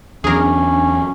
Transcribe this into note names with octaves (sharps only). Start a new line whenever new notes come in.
E2 F#3 C#4 D4 G#4 A#4